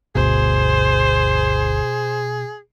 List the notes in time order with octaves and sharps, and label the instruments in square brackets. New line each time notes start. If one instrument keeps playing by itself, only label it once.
[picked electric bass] G1 D2 [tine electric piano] B2 [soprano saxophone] G#4 [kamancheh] C5